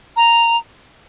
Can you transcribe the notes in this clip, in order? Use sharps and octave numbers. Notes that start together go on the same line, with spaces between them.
A#5